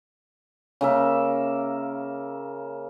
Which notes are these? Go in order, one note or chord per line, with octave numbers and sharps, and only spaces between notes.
C#3 A#3 E5